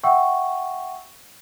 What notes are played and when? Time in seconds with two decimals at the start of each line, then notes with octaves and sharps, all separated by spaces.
0.03 E5 F#5 G5 C#6 E6